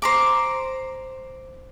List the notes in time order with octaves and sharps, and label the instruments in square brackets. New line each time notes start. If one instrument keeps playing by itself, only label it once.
[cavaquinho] C5 A#5 D6